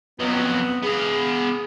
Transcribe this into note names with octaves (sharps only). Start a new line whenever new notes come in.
F2 F#3 B3
B3 G#4 F5